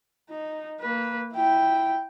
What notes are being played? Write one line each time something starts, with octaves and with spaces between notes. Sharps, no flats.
D#4
A#3 B4
E4 G5